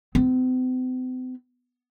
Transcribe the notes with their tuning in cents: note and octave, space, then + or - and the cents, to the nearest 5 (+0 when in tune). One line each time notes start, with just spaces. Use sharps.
C4 -45 E4 +0